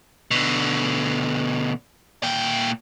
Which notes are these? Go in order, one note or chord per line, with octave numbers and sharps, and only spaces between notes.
B2 D3
A#2 G5